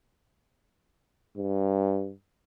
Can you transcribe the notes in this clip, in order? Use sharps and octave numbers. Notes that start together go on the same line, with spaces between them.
G2